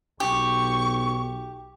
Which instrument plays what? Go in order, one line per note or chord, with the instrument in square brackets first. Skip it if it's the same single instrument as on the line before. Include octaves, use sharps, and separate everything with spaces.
[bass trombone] B1 [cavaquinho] G4 [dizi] C#6